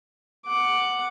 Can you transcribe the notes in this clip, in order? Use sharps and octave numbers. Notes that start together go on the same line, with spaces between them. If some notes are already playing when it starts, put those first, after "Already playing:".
F#5 D6